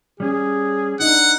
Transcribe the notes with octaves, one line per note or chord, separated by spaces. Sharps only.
G3 C#4 G#4
D4 D#4 F#5